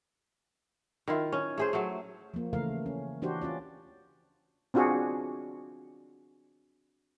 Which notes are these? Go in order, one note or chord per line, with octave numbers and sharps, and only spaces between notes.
D#3 E4 F4
C#4
A3 G#4 C5
F#3 A3
F3 A#3
C#3 E3 A3 A#4 F5
C#4
E3 D4 F#4 G4 C5
C#4 F4 D5
C4 D4 F4 F#4 G#4